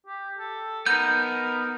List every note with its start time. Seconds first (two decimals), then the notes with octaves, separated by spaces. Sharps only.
0.07 G4
0.39 A4
0.86 B3 D#4 A#4 G6